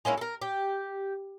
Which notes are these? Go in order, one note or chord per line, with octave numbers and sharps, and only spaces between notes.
G#3 A#3 C#4 E4
A4 A#4
G4